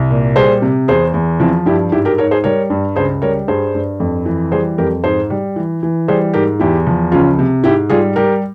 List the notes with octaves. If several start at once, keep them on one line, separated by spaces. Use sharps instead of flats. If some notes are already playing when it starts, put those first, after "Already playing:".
Already playing: C2
A#2
G3 G#4 C5
C3
E2 G#4 C5
E2
F3 C4 E4
G2 E4 G4
G#2 E4 G4
G4 A#4
G#2 A#4 C#5
G#4 C5
G3 A#4 C#5
G2
C#2 G#4 C5
G3 A#4 C#5
G2 G#4 C5
G2
F2
E3
G3 G#4 C5
F2 G4 A#4
G#2 G#4 C5
G3
E3
E3
G3 G#4 C5
G#2 G4 A#4
E2 E4 G4
F3
C#2 C#4 F4
C3
G#2 E4 G4
G3 F4 G#4
G3 G4 A#4